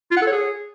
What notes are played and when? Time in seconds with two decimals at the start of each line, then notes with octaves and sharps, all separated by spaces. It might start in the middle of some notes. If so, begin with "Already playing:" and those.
0.11 F4
0.17 F#5
0.22 A4
0.27 C#5
0.32 G#4